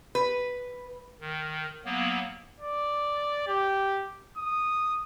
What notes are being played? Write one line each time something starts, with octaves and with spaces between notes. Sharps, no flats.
B4
D#3
F#3 A#3 B3
D5
G4
D#6